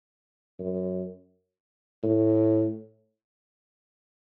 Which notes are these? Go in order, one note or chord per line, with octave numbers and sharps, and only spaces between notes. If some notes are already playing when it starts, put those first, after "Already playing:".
F#2
A2